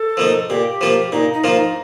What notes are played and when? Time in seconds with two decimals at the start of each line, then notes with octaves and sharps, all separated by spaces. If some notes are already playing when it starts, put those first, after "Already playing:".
Already playing: A4
0.17 F3 A#3 D#4
0.49 A#2 G4
0.81 F3 A#3 F4
1.12 A#2 D#4
1.34 D#4
1.44 F3 A#3 F4
1.55 D#4